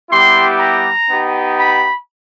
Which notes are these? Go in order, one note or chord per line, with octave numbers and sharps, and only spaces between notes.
G3 B3 E4 G4 C6
A#5
B3 D#4 G4
B5